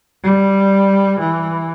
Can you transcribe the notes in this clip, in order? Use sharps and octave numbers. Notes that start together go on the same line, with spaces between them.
G3
E3